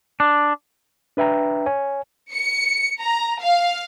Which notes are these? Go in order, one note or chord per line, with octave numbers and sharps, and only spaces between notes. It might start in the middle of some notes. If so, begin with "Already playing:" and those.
D4
D4 B4 E5 G5 A#5
C#5 G#5
C#7
A#5
F5